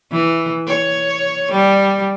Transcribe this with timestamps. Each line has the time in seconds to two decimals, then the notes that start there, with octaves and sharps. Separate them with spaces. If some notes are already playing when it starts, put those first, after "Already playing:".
0.12 E3
0.68 C#5
1.52 G3